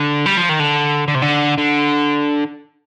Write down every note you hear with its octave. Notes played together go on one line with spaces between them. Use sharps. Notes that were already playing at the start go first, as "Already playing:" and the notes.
Already playing: D3
G3
F3
D#3
D3
D3
C3
D3
D3